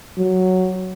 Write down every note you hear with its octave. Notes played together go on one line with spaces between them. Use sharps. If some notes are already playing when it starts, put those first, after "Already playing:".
F#3